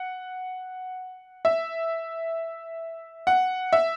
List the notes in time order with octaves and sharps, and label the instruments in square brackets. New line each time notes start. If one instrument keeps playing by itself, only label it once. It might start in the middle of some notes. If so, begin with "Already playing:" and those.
Already playing: [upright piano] F#5
E5
F#5
E5